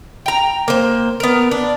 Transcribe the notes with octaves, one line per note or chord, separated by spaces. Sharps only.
G5 A#5
A#3 C5
B3 A#4
D4